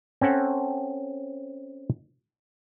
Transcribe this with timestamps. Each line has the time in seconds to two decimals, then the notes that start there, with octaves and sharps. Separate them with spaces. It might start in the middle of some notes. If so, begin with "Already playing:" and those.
0.21 C4 C#4 A4 F#5